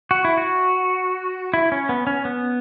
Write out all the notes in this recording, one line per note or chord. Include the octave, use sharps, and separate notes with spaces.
F#4
E4
F#4
E4
C#4
B3
C#4
B3